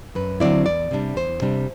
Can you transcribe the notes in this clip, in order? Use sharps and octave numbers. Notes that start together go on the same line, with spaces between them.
F#2 B4
D3 F#3 C4 E4 D5
E2 D5
C3 G3 D4
E2 C5
C3 G3 D4